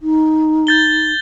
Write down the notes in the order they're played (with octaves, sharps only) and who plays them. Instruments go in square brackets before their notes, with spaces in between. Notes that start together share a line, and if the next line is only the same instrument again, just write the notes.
[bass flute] D#4
[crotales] G6 A6 G7